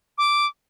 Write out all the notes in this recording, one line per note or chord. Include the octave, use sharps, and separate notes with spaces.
D6